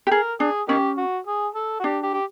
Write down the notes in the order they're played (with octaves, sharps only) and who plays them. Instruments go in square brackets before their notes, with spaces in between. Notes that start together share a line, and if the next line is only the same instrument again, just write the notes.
[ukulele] G4
[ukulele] G#4 [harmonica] A#4
[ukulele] D4 [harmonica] G#4
[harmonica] A#3 D#4 G4 [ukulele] C#4
[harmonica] F#4
G#4
A4
F#4
[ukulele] D4 [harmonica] G4
[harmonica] G4
G4